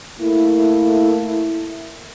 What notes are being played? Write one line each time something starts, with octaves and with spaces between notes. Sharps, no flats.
A3 A#3 E4